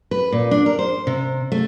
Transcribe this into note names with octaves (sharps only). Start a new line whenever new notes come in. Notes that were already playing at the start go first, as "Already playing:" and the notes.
B4
A#2
D4
A#4
C5
C3
A3